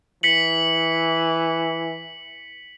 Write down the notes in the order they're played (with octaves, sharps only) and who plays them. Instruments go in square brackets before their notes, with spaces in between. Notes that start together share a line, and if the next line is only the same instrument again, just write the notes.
[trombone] E3 [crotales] B6 C#7 F#7